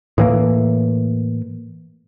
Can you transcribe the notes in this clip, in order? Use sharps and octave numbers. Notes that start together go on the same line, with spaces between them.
A2 E3 A#3